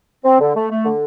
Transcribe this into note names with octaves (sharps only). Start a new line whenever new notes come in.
C4
D3
A3
A3
D3